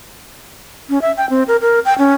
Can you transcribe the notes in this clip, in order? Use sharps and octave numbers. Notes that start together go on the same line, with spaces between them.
C#4
E5
G5
C4
A#4
A#4
G5
C#4